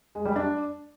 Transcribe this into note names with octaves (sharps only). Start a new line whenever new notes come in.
G#3
G3
D4